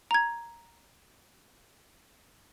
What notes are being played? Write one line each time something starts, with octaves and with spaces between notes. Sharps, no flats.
A#5 G#6